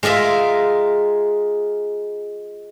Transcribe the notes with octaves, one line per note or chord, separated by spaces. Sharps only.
G#3 F4 G#4 A#4 E5